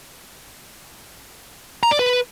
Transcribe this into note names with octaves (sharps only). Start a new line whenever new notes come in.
A#5
D5
B4